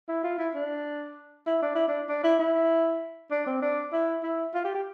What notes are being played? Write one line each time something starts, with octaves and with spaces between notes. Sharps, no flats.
E4
F4
E4
D4
E4
D4
E4
D4
D4
E4
E4
D4
C4
D4
E4
E4
F4
G4
G4